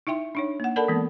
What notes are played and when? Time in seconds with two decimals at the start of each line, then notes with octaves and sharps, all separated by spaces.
0.07 D#4 E4 E5 G5 C6
0.35 D4 D#4 C#5
0.60 A#3 F#5
0.76 A4 A#4 D5 F#5 A5 B5
0.88 E3 G#3 A#3 B3